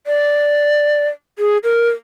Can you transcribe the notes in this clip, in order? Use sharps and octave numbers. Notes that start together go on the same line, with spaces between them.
D5
G#4
A#4